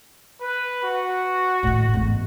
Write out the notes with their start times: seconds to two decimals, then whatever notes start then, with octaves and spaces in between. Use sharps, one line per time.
0.39 B4
0.82 F#4
1.63 A2 D#3
1.94 G#1 E2